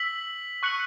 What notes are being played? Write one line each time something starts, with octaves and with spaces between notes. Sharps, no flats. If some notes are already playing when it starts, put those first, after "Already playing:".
Already playing: E6 B6 F#7
C#6 F#6 C#7 F#7